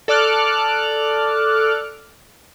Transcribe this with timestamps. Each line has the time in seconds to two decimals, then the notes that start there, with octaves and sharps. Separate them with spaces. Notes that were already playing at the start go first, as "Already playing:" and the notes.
0.08 A4 D5 D6 F6 F#6